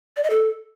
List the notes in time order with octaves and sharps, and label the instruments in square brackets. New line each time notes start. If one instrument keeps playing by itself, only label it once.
[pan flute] D5
D#5
A4